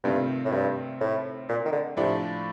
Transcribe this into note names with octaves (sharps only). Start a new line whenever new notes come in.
G2 C3 D#3 A3 C4 F4
A2
G2
A2
A#2
D#3
D3
A2 C3 F3 A3 D4